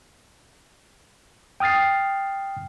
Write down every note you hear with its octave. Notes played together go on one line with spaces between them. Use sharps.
G5 D#6 F6 A6 C7